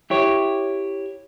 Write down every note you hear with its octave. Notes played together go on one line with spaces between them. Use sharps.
E4 G4 C#5